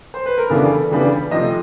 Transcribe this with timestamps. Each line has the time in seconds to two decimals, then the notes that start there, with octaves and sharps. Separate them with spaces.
0.14 C5
0.26 B4
0.38 A#4
0.50 C#3 E3 G3 B3 D4 A4
0.91 C#3 E3 G3 B3 D4
1.31 C3 F3 A3 D#5